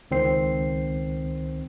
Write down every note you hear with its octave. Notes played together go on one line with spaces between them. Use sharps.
C#2 D#3 C4 C5 C7